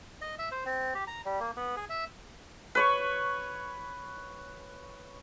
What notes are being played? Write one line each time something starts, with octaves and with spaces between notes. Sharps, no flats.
D#5
E5
C5
C4
G4
A#5
G3
A#3
B3
G#4
E5
B4 C#5 C#6